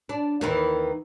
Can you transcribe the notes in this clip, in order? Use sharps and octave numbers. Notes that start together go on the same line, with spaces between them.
D4
D#2 D#3 E3